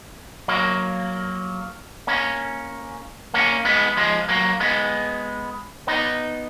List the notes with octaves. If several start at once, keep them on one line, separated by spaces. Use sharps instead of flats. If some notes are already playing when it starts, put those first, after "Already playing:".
F#3 A#3
A#3 C#4
A#3 C#4
G#3 B3
F3 G#3
F#3 A#3
G#3 B3
B3 D#4